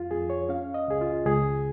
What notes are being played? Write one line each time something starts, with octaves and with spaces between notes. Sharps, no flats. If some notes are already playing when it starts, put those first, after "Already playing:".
Already playing: F2 F4
F2 G#4
C#5
C#4 F5
D#5
C#2 G#4
F4
C#2 G#4